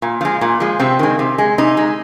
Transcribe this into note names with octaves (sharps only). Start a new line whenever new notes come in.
A#2
F3 G#3
A#2
F3 G#3
C3 C4
D#3 G#3
C3
G#3
C3 D#4
G#3